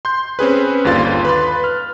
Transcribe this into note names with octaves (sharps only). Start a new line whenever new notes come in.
C6 G6
C4 C#4 G#4 B4
G1 D#2 D3 F4 C6 A6
B4 B5 C6
F6